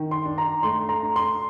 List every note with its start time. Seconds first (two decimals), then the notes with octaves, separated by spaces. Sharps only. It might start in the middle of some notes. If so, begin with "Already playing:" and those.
Already playing: D#3
0.11 C6
0.25 D4
0.38 A#5
0.63 A3 C6
0.89 A#5
1.03 D4
1.16 C6